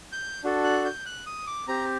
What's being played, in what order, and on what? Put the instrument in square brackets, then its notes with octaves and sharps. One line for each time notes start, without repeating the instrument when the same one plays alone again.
[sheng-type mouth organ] G6
D4 F#4 A4
F#6
G6
F#6
D#6
D6
C4 G4 A#5